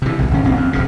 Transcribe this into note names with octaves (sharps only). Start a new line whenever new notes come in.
C3 E3
G#1 C#2
G#1 C#4
D1 A#1 C4
F2
E1 F#2 C#3